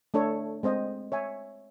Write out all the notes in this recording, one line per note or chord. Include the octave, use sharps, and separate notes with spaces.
A3 D4 A4 C#5
G#3 C4 C5 D#5
C#5 E5 G#5